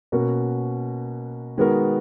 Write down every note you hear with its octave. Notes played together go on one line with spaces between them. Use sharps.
B2 A#3 C#4 F#4 A#4
D#3 G#3 B3 F#4 A#4